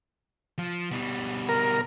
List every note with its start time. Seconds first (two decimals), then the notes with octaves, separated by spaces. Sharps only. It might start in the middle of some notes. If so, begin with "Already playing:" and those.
0.58 F3
0.91 B2 G3
1.49 A#4